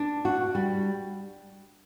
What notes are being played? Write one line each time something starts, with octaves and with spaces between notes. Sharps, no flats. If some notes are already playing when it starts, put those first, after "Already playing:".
Already playing: D4
F#4
G3